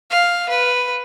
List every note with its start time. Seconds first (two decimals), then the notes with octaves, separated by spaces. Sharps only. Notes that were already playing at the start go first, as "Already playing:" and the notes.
0.11 F5
0.49 B4